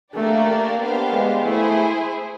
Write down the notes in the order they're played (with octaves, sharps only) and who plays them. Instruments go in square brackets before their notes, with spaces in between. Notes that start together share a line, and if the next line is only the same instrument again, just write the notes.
[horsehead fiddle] A3 [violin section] A#3 D4 G4 A#4 D5
[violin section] B3 D4 G4 C5 F5
[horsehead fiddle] G#3
[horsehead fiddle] A3 [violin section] E4 G#4 C5